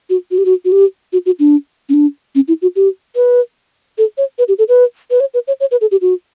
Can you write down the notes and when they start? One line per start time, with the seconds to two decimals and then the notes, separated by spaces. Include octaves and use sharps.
0.10 F#4
0.31 F#4
0.38 G4
0.45 F#4
0.65 F#4
0.72 G4
1.13 F#4
1.26 F#4
1.39 D4
1.89 C#4
1.94 D4
2.35 C#4
2.48 E4
2.62 F#4
2.76 G4
3.16 B4
3.98 A4
4.18 C#5
4.39 B4
4.48 G4
4.59 A4
4.69 B4
5.11 B4
5.20 C#5
5.34 B4
5.48 C#5
5.60 C#5
5.71 B4
5.81 A4
5.91 G4
6.01 F#4